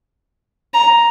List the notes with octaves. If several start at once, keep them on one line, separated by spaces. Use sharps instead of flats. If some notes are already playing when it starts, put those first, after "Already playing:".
A#5